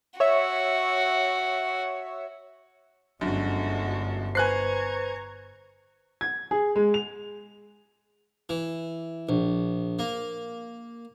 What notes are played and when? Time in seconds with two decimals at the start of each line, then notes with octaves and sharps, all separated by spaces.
0.20 F#4 C#5 E5
3.21 G1 F#2 D3 G#3 F#4 A4
4.35 B4 C5 G#5 A#5 C#6 F#6 G#6 C7
6.21 G#6
6.51 G#4
6.76 G#3
6.94 F7
8.49 E3
9.29 A#1
9.99 A#3